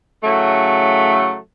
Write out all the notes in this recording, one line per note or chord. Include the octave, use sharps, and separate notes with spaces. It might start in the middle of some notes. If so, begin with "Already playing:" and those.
A2 C#3 F#3 A3